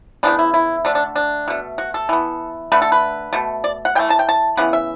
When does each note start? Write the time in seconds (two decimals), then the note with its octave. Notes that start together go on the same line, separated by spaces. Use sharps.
0.23 C#3 E3 B3 D4
0.39 E4
0.54 E4
0.85 D3 A3 D4
0.95 D4
1.16 D4
1.48 B2 A3
1.78 F#4
1.94 A4
2.09 E3 B3
2.72 D3 A3 B4
2.82 A4
2.92 B4
3.33 B2 A3
3.64 D5
3.85 F#5
3.95 E3 G5
3.99 A3
4.10 A5
4.19 G5
4.29 A5
4.57 C#3 E3 B3 F#5
4.73 E5